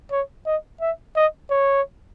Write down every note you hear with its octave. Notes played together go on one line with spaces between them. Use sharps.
C#5
D#5
E5
D#5
C#5